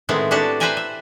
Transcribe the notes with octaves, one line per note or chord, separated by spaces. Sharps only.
A2 D#3 G#3 B3 C4 E4
D4 E4 F#4 G4 A4 A5
B4 C5 E5 G5 G#5 A#5
E5